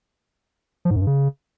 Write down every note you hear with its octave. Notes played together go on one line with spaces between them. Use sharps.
F3
G#2
F#2
G2
C#3